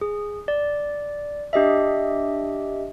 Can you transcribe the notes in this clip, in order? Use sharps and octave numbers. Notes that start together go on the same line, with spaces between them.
G#4
D5
D4 G4 D#5 E5